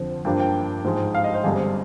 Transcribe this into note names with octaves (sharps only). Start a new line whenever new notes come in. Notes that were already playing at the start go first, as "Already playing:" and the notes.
Already playing: F2 D3 F3 C4
G2 F3 A#3 D4 G5
G5
G#2 F3 G#3
F5
D#5
C5
G1 G2 D3 G3 C4 G#4